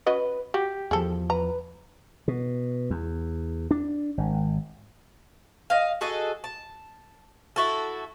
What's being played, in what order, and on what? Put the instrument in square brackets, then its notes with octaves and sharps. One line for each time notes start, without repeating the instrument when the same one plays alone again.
[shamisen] C#4 F#4 D#5 [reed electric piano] B4
[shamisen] F#4 [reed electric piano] G4
[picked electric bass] E2 F3 [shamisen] G#4 A4
[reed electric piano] B4 [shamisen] A#5
[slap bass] B2
E2
D4
G#1
[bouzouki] D#5 F5
F#4 G#4 A4 D#5
A5
E4 F#4 A4